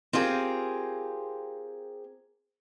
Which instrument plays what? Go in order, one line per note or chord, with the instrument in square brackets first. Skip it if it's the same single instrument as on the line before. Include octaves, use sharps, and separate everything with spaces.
[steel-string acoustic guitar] C4 F4 G4 G#4 A#4